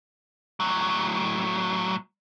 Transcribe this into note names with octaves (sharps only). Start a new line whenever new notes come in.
A2 F#3